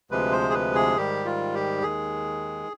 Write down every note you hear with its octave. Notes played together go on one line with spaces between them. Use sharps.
D2 C3 F3 G#3 B4
C5
G#4
B4
G#4
G#2 D#3 G3 G4
F4
G4
D#2 D#3 G#3 G#4